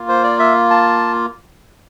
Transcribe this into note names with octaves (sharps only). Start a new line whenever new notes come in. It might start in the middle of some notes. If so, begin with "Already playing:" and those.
Already playing: A#3 F4
C5
D5
E5
A5